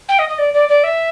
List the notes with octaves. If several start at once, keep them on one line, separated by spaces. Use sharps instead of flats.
G5
D#5
D#5
D5
D5
D5
E5